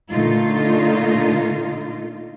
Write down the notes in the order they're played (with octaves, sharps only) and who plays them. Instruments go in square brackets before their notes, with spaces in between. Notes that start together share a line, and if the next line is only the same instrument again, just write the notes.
[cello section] A#2 D3 A3 D#4 F4